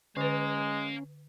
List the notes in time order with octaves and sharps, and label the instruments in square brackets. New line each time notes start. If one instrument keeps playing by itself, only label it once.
[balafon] D3 B4 [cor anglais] G#3 [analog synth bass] C#4 [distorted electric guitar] F5 A#5